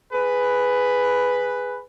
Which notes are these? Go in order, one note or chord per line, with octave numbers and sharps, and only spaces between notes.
G#4 B4